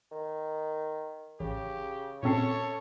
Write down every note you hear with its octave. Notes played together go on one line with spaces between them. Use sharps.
D#3
A1 C#3 G4
A#2 C4 C#4 A4 C#5 A5 C7